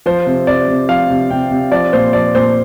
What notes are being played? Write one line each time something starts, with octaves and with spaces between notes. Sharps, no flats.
F3 C5
C3
C3 D5
C3
F3 F5
C3
C3 G5
C3
F3 D5
A#2 C5
F3 D5
A#2 C5